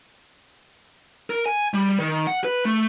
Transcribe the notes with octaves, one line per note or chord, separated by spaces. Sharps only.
A#4
G#5
G3
D#3
F#5
B4
A3